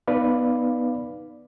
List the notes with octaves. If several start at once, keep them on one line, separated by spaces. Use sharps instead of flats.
B3 D#4 B4 D5 F5